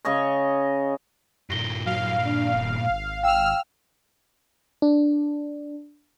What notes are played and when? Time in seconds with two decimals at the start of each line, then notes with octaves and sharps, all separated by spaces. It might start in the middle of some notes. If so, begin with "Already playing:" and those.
0.05 C#3 C#5 D#5 C#6
1.50 G2 A#2 A#6 G7
1.86 F#3 F5
2.25 D4
2.55 D#1
2.90 G#1
3.23 F5 G5 E6 F6
4.82 D4